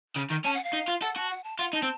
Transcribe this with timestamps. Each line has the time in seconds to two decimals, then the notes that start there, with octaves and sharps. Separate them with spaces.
0.16 C#3
0.30 D#3
0.44 C#4 A5
0.54 F#5
0.64 F5
0.73 D#4
0.88 F4
1.01 A4 F#5
1.16 F#4 A5
1.30 F#5
1.44 A5
1.59 F4 F#5
1.73 D#4 A5
1.82 C4